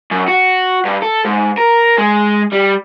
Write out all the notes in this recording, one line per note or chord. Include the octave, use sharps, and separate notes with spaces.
F#2
F#4
G2
A4
G#2
A#4
G#3
G3